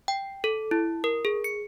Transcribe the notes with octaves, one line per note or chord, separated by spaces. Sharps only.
G5
A4
E4
A#4
G#4
C#7